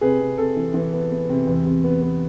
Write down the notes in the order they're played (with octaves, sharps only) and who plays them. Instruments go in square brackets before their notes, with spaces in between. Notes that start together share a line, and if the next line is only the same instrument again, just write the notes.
[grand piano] C3 G#4 B4
C3
C3 A4
E3
E3
B3
B3
C3
E2
C3
B3
B3